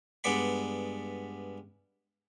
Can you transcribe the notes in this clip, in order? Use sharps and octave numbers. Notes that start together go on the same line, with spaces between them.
G2 G#3 B3 D5 F#5 B5